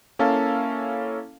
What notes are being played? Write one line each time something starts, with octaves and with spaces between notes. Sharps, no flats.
A#3 C#4 E4 A4 F5 A5